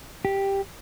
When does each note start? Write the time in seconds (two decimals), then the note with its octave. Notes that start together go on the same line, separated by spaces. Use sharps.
0.25 G4